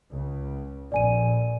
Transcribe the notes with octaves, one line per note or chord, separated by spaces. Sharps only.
C#2 C#3
A#1 F2 D5 G#5 D#7